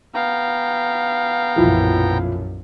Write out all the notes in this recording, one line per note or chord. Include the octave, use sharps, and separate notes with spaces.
B3 F5 G5 A#5
B1 F#2 A#2 E3 F3 E4